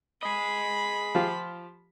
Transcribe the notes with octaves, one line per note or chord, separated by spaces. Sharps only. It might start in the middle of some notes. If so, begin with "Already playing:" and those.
G#4 D#5 B5
F3 F4 G4